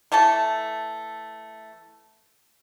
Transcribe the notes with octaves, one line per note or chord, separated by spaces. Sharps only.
E3 A3 A4 A5